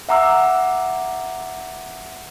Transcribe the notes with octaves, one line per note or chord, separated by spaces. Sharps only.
E5 F#5 A#5 D6 E6